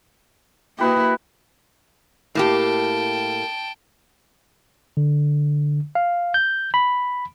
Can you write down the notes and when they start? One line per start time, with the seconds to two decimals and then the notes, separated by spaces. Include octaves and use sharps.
0.78 A#3 E4 F#4 G4 B4 D#5
2.35 A2 A#3 G4 G5 A5
4.97 D3
5.95 F5
6.34 G6
6.74 B5